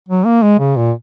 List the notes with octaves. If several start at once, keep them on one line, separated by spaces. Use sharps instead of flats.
F#3
A#3
G#3
C#3
A#2